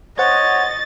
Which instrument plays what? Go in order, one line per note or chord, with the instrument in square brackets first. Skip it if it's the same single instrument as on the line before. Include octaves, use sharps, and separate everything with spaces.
[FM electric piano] C5 F#5 [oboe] C#5 [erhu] D#5 [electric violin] A6